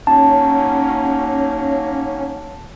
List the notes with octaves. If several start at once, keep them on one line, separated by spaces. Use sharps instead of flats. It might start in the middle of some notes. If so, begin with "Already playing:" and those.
F#3 A#3 C#4 D#4 A5